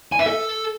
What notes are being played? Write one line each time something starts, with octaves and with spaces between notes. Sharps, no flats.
G#5
E5
A4